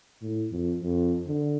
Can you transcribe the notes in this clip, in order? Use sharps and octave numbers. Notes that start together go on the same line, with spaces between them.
A2
F2
F2
D3